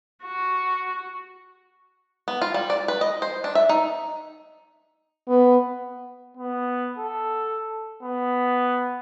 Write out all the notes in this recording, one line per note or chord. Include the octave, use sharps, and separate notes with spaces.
F#4
B3
F4
G3
D5
B4
D#5
C5
D4
E5
D#4
B3
B3
A4
B3